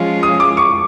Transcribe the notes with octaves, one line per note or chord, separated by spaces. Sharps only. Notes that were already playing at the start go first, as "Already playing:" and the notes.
Already playing: F3 G#3 C#4 F4
D#6
D6
C#6